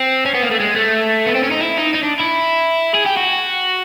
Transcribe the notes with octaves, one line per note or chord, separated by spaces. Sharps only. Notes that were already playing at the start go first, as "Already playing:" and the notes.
Already playing: C4
C#4
B3
A#3
A3
G#3
A3
B3
C4
C#4
D#4
E4
D#4
D#4
D4
E4
G#4
G4
F#4